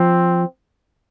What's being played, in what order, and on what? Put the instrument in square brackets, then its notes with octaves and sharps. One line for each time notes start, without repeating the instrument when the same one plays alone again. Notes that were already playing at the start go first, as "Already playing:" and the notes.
Already playing: [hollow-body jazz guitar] F3 [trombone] C4